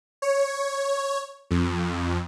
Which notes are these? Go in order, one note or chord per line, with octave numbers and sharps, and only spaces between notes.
C#5
F2